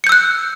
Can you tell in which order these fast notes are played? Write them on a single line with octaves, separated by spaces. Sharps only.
C#7 G6 E6 F#6